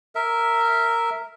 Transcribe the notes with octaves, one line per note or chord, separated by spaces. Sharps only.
A#4 E5